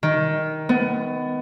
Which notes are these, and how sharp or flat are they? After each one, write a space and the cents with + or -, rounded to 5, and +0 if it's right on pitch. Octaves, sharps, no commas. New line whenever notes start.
D#3 +10
B3 +20